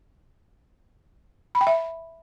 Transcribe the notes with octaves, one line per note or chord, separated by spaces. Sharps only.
B5
G5
E5